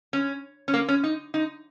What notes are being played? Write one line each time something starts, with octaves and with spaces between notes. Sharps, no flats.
C#4
C#4
A#3
C#4
D#4
D#4